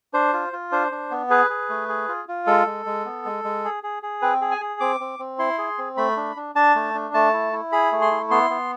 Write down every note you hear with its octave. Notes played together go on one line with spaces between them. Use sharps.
D4 C5
F4
F4
D4 C5
D4
B3
G#4 B4
G#4
A3
G#4
F4
F4
G#3 A4
G#3
G#3
B3
G#3
G#3
G#4
G#4
G#4
C4 B4
G#4
G#5
G#4
C4 D6
C4
C4
E4 C6
G#4
C4
A3 B5
D4
D4
D4 A5
A3
D4
A3 A5
E4
E4
G#4 B5
A3
C6
E4
B3 C6
B3